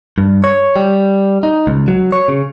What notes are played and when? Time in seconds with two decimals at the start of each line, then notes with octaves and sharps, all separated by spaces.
0.18 G2
0.44 C#5
0.76 G3
1.43 D#4
1.67 C#2
1.88 F#3
2.12 C#5
2.28 C#3